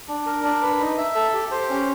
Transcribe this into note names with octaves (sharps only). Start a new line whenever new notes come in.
D4
A#4
D4
B4
D#4
E5
A4
G4
C5
C#4